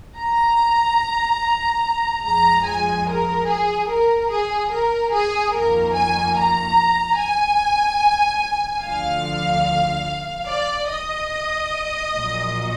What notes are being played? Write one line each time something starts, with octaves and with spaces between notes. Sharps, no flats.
A#5
F2 F3 G#3 A#5
G#5
A#4
G#4
A#4
G#4
A#4
G#4
F2 D#3 A#3 A#4
G#5
A#5
G#5
D2 D3 F3 F5
D5
D#5
A#1 A#2 F#3